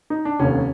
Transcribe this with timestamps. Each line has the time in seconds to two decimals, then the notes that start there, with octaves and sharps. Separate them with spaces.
0.10 D#4
0.25 D4
0.39 F1 D#2 D3 C#4